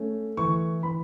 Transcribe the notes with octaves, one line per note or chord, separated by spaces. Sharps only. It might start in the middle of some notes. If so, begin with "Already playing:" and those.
Already playing: A3 C#4
E3 C#6
E3 B5